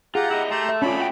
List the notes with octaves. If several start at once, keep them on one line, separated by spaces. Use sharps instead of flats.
F4 G4 G#4 F#5 A#5
E4 D#5
A3 G4 A#5 C6
E5
A3 C4 C#4 F4 D5 B5
A3 F#4 G5